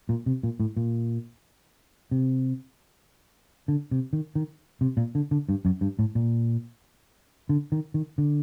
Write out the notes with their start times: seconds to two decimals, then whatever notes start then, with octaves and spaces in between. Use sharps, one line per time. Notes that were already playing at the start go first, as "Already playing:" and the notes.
0.09 A#2
0.26 C3
0.43 A#2
0.60 A2
0.77 A#2
2.11 C3
3.68 D3
3.91 C3
4.13 D#3
4.35 D#3
4.81 C3
4.97 A#2
5.15 D3
5.31 D3
5.49 G2
5.65 F#2
5.81 G2
5.99 A2
6.15 A#2
7.49 D3
7.72 D#3
7.94 D#3
8.18 D3